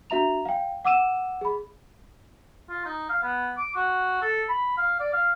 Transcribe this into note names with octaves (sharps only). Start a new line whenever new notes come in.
D4 F#4 E5 A#5 F7
F5 G5
F#5 D6 E6 D#7 E7
G#4 B5
F4
D#4
F5
B3
D6
F#4
A4
B5
F5
D5
F5